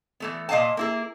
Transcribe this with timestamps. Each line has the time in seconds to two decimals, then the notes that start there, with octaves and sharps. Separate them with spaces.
0.20 E3 A3 B3
0.49 A#2 D#5 F5 G#5 A5
0.77 A#3 E4 G#4